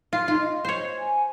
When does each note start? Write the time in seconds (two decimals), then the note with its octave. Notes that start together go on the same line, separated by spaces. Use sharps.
0.13 F4
0.28 D#4 F4
0.40 D#5
0.65 C5 C#5
0.98 G#5